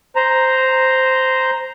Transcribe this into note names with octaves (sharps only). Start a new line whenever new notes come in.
C5 A#5